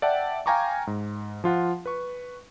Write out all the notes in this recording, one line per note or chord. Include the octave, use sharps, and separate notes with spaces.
D5 E5 F#5 G5 A5
F5 G5 G#5 A#5 C#6 D6
G#2
F3 F4 F#5
B4 C#6